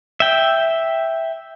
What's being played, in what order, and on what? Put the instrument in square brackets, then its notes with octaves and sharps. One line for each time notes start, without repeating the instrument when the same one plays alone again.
[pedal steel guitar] E5 G5